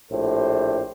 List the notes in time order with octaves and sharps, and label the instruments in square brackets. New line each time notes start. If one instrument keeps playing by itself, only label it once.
[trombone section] A#1 A2 G4 A4 C5